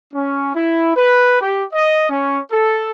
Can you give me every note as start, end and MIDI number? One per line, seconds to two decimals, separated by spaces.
0.12 0.51 61
0.53 0.93 64
0.94 1.37 71
1.40 1.63 67
1.72 2.07 75
2.08 2.38 61
2.51 2.89 69